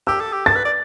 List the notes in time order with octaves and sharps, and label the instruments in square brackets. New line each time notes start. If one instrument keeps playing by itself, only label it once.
[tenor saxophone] G4 [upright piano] E6
[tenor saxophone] A4
G4
[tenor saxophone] A4 [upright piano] A6
[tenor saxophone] B4
D5